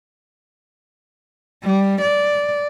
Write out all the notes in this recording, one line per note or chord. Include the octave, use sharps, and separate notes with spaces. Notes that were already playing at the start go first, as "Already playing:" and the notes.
G3
D5